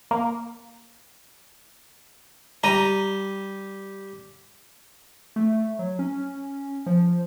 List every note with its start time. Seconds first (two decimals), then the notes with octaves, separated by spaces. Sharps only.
0.11 A#3
2.64 G3 A#5 D#7 G7
5.36 A3
5.79 F#3
5.99 C#4
6.86 F3